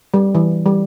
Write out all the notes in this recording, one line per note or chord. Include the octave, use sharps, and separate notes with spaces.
G3
E3
G3